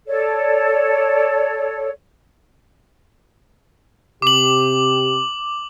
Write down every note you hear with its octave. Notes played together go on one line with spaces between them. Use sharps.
A4 C#5 D5
C3 G4 D6 F#7